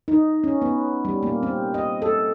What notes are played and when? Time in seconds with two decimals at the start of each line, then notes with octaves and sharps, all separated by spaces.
0.08 D#4
0.44 C#4
0.62 B3
1.05 G3
1.23 A#3
1.43 C4
1.74 D#5
2.02 A4